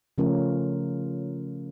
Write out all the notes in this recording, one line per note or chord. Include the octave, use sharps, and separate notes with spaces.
C#3 F3 A3 C#4 F4 A#4